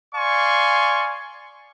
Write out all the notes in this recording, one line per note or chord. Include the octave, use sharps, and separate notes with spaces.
D5 F5 G#5 C6 C#6